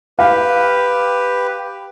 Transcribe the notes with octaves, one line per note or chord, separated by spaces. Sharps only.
G4 B4 F5